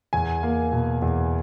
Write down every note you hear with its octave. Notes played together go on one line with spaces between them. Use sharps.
E2 G#5
A#3
B2
E2